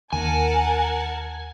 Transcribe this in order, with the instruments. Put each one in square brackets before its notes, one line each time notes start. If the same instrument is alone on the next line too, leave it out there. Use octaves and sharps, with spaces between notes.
[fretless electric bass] D#2 [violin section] A#4 F#5 A5 [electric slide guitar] G#5